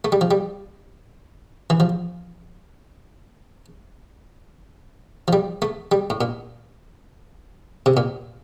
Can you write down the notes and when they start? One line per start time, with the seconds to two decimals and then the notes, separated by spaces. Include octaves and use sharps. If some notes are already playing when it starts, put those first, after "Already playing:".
0.05 A3
0.12 G3
0.21 F3
0.31 G3
1.70 E3
1.80 F3
5.28 F3
5.33 G3
5.62 A3
5.92 G3
6.10 A2
6.21 A#2
7.86 C3
7.97 A#2